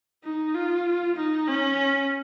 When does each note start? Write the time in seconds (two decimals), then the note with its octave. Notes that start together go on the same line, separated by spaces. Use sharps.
0.24 D#4
0.54 F4
1.16 D#4
1.47 C#4